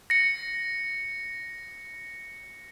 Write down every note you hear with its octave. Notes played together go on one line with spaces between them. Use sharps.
A#6 C#7